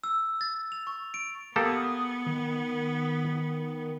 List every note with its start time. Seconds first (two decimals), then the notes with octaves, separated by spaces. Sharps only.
0.04 E6
0.41 A6
0.72 F7
0.87 C#6
1.14 D7
1.56 A#3 B3 G4 A4 D#6
2.26 D#3